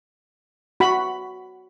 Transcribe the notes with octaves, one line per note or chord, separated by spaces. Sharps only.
F#4 B5